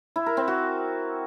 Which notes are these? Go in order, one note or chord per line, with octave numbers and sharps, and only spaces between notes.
E4
A#4
C4
F#4